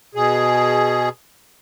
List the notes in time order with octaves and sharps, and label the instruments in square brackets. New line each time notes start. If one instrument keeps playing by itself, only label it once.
[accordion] B2 G#4